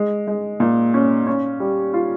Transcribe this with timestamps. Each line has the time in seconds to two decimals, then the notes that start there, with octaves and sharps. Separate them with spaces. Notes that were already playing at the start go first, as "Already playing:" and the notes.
Already playing: G#3
0.27 G#3
0.60 A#2
0.94 C#4
1.27 C#4
1.60 G3
1.94 F4